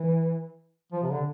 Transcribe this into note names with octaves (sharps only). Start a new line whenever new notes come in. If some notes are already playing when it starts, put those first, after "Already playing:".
Already playing: E3
F3
C3
D3